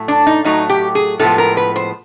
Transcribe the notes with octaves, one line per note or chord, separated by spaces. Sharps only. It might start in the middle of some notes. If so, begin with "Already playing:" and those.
Already playing: A2 F#3 A3
D4
D#4
A2 F#3 A3 D#4
G4
G#4
A2 F3 G#3 B3 A4
A#4
B4
C5